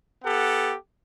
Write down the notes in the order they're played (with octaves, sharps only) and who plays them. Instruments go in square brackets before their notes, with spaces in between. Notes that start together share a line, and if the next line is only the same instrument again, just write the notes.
[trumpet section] B3 G4 A4 F#5